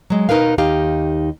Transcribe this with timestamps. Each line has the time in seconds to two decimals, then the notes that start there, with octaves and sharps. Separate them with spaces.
0.10 F#3 G#3
0.29 B2 D#4 A#4 B4 F5
0.58 D#2 D#4 G4 F5